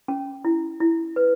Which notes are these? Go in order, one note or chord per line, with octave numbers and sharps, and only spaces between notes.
C#4
E4
E4
B4